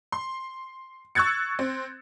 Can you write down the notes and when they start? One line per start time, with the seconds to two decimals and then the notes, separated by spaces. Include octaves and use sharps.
0.12 C6
1.15 C#6 E6 F#6 G#6 A6 C#7
1.59 C4